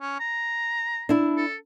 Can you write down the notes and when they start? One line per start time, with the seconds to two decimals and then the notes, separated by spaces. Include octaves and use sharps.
0.01 C#4
0.20 A#5
1.09 D4 E4
1.37 A4